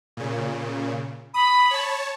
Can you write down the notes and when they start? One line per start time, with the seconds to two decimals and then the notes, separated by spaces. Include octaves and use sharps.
0.17 A#2 C#3
1.34 B5 D#6
1.71 C#5 A5